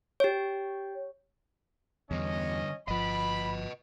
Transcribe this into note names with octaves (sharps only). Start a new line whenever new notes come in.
G4 C#5
E2 D3 G3 C#4 D#5
G1 F3 B4 D#5 B5